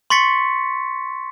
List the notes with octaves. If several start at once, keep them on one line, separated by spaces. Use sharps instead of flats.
C6 C#6 A6 B6 C#7